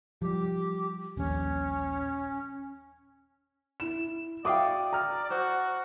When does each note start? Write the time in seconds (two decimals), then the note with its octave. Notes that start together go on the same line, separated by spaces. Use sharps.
0.22 F3 G3 G4
1.17 D#1 A#1 C#4
3.80 E4 E7
4.45 F#4 D5 E5 F5 G5 D6 D#6
4.93 A#5 F6
5.30 F#4 C5